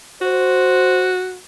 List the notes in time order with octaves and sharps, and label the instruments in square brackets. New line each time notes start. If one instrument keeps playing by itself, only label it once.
[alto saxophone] F#4 [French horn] C5